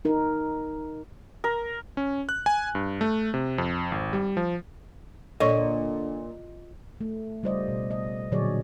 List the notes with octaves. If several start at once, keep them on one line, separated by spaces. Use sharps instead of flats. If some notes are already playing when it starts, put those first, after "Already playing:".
D#4 A#4
A#4
C#4
F#6
G#5
G2
A3
C3
F2
G#1
G3
F3
A#2 D3 A4 C#5 D#5 C#6
A3
C#3 G3 F4 C5 D5 D#5
B2
D#5
A#2 D3 F#3 G#4 C#5 D5